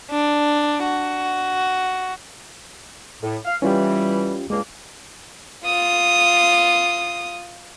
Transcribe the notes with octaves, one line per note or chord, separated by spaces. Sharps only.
D4
F#4
A2
F5
E3 G3 C#4 F4 G4
C#2 G2 G#3 A#3
F4 D#6